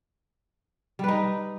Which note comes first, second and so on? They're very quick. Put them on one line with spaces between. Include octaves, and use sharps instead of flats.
G3 B4 D#4